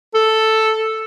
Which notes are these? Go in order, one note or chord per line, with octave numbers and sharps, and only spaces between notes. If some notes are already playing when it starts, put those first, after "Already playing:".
A4